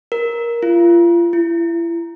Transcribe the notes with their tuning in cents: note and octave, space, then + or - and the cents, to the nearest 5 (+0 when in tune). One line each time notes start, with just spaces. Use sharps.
A#4 +10
F4 -35
E4 +35